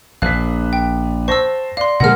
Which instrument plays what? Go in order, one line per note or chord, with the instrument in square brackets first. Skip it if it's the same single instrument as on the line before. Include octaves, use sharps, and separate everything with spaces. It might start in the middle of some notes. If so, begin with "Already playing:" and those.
[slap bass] A#1 [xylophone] F5 [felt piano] F#6 B6
[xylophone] G5
[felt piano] C5 A5 A#6 [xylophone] C#6 E6
[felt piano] D5 [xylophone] F5 C6
[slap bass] B2 D3 F3 [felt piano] G#3 A#4 A#6 [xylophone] F#5 F6